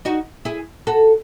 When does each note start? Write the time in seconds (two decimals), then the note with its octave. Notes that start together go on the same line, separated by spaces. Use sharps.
0.05 D#4 F#4
0.45 E4 G#4
0.87 F#4 A4